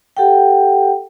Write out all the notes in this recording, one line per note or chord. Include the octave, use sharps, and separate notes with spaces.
G4 A4 F#5 G5